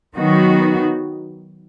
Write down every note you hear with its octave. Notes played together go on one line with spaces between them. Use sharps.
D#3 F#3 B3 D#4 F#4